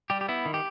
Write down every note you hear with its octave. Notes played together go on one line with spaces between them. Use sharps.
G3 G4
G4
B3 E4
D#3
G4